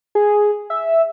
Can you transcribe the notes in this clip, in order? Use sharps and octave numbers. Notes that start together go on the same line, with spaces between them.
G#4
E5